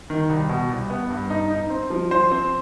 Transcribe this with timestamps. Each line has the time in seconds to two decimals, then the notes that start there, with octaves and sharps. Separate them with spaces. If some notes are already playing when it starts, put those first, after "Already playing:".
0.10 D#3
0.29 C2
0.49 B2
0.70 C2
0.90 B3
1.10 G2
1.30 D#4
1.50 D#4
1.70 C4
1.90 F3
2.11 F3 C5
2.32 C4